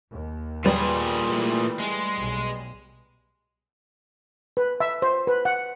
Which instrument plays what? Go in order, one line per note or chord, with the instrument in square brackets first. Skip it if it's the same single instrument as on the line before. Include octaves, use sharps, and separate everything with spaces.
[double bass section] D#2
[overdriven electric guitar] A#2 G#4 [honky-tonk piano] G3 B4
[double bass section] E3 A3
[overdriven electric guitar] G#3
[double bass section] B1
[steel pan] B4
E5
C5
B4
F#5